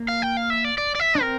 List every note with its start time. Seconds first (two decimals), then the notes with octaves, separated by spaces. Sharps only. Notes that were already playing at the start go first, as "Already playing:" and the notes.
Already playing: A#3
0.08 F5
0.22 G5
0.37 F5
0.50 E5
0.64 D5
0.78 D5
0.95 D5
1.00 E5
1.15 D4
1.21 C4 A#4